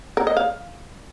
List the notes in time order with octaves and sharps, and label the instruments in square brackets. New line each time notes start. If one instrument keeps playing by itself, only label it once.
[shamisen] A#4
D#5
F5